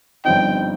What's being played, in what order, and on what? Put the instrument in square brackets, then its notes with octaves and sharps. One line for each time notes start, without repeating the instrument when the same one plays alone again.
[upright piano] G1 G2 F3 C4 D#4 [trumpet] G5